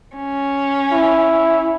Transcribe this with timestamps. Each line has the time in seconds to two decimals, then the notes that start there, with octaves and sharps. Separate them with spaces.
0.16 C#4
0.92 E4